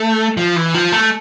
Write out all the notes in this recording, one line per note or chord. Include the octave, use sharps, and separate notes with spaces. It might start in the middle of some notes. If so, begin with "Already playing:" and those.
Already playing: A3
F3
E3
F3
A3